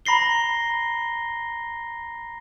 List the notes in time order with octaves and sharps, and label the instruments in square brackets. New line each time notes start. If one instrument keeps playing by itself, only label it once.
[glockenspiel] A#5 B5 A#6 C7 G7